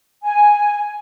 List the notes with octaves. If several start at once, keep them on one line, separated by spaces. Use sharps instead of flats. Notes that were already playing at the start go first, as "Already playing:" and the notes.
G#5